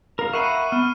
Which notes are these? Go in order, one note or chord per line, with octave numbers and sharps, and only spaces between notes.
A#4 F5 A#5
E5 F#5 B5 C#6 C7 D#7
B3 F6